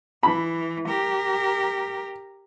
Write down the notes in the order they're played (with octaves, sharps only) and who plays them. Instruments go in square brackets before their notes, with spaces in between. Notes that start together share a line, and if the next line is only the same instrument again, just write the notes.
[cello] E3 [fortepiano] B5
[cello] G4 A#4